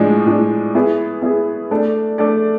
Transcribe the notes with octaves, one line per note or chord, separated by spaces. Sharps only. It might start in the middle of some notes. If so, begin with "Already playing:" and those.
Already playing: A2 F3 G#3 D4
A2 F3 G#3 D4
B3 E4 G#4
B3 E4 G#4
A3 D4 A4 D5
A3 D4 A4 D5